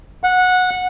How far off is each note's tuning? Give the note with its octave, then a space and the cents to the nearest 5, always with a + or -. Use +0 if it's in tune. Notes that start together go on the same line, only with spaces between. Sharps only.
F#5 -15